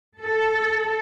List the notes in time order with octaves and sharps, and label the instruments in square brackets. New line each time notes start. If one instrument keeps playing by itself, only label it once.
[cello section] A4